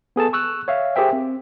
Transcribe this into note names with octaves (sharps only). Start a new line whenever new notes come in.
B3 G#4 A4 A5
C#6 E6 F#6
C#5 E5 F5
G4 G#4 A#4 C5 E5 G5
C4